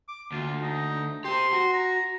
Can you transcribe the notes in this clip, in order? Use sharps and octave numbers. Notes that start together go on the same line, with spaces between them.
D6
D2 F4
D#4
G4 C5 C6
F#4
A#5